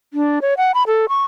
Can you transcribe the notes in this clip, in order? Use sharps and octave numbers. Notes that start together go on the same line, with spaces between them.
D4
C#5
F#5
B5
A4
C#6